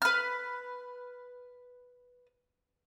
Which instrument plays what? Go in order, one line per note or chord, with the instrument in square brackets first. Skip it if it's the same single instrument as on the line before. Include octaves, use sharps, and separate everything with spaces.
[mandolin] B4 F6